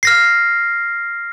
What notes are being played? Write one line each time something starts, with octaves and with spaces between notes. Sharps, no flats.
F6 A#6 C7